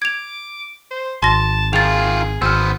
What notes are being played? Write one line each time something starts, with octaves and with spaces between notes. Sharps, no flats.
D6 G#6 F7
C5
G#1 A5 C6 A#6
D#3 F4 G#4 A6 F7
G#1 B3 C5 E6 F6